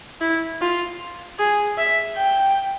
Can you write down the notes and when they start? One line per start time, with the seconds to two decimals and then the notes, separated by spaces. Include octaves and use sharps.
0.21 E4
0.61 F4
1.38 G#4
1.78 E5
2.17 G5